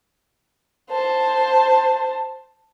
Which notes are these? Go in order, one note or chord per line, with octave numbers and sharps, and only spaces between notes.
C5 A5